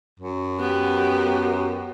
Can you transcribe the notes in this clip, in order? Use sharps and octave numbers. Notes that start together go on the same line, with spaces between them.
F#2
B3 G4